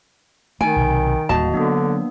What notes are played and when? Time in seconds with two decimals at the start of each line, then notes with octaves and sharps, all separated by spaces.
0.61 D#3 A3 D#4 G#5 D7
0.76 B1 C3
1.29 D1 D#2 G3 A#3 F#4 D#5 A5
1.54 D3 F#3 A#3 B3 D4